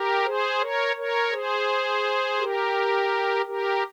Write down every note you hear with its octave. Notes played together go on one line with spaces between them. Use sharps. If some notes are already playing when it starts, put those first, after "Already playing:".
Already playing: G4 A#4
G#4 C5
A#4 C#5
A#4 C#5
G#4 C5
G4 A#4
G4 A#4